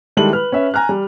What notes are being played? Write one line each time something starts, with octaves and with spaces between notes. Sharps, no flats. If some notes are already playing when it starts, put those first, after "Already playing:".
D#3 G3 G#3 E4 A4 F#7
B4 F6
C#4 B4 E5
G#5 A#5 F6 F#6
G3